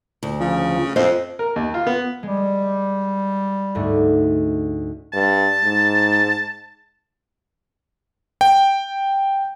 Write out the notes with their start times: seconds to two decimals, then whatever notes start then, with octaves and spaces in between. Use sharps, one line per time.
0.23 D2
0.40 C#3 F3 F4
0.96 F2 C5 D#5 F5
1.39 A#4
1.56 D#2
1.74 F4
1.87 B3
2.23 G3 G#3
3.75 D2 G#2 A3
5.13 G2 A5
5.64 G#2
8.41 G5